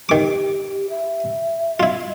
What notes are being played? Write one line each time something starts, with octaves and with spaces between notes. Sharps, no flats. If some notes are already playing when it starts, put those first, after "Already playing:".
D#3 G4 D6
E5
E4 F4 D#5